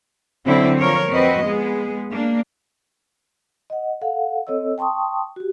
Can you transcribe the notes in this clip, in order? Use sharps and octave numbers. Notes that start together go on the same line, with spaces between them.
D3 F#3 C4 E4
F3 A#4 C#5
F2 C4 F#4 B4 D#5
G#3 B3 G#4
A#3 D4
D#5 F#5
A4 F5 F#5
C4 A4 C#5 D#5 E6
G5 A5 C6 C#6 D#6
F#4 G4